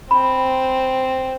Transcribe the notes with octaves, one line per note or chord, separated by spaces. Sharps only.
C4 B5